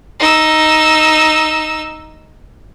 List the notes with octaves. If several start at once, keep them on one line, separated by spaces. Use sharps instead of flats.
D#4 E6